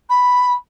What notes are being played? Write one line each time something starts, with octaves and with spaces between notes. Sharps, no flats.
B5